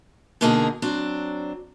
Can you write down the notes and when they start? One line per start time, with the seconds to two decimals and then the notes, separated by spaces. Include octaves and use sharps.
0.41 B2 D3 A#3 D#4 E4 G#4
0.82 F#3 C4 D4